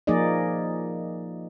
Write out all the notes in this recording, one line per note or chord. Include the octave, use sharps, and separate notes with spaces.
F3 A#3 D#4 G#4 D5 D#5